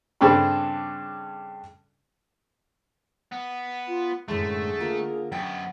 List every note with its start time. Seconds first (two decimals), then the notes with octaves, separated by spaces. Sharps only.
0.21 G2 C#3 C4 D4 A4 B5
3.32 B3
3.88 F4
4.28 F#2 A2 D3 G#3 A3 G#4
4.80 A#3 F4 A#4
5.32 F#2 B3 G5